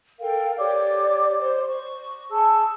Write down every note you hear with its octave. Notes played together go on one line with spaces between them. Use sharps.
A4 A#4 F5 G5
G4 C#5 D5 D6
C5
C#6
G#4 A5 E6